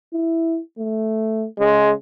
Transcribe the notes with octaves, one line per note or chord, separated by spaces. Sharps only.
E4
A3
C#3 G#3